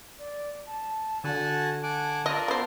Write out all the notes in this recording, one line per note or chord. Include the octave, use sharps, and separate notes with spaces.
D5
A5
D3 F#4 F#5 G#5 A5
F#5 G#5 A5 D6
F4 A#4 D5 D#5
B3 C5